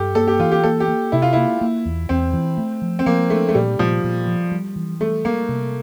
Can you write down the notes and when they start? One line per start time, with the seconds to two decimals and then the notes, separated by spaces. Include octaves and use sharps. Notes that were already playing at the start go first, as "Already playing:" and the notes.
Already playing: G2 G4 A4
0.15 A#3 A4
0.28 G4
0.39 E3 F4
0.52 G4
0.64 A#3 A4
0.80 G4
0.88 A#3
1.12 C3 E4
1.22 F4
1.33 A#3 E4
1.61 A#3
1.85 E2
2.09 E2 C4
2.33 E3
2.58 A3
2.82 F3
2.99 C4
3.06 F3 A#3
3.30 A3 D4
3.49 A3
3.55 A#2 G3
3.79 A#2 F3
4.04 A#2
4.27 F3
4.52 G3
4.76 E3
5.00 G3 A3
5.25 G3 A#3
5.49 C3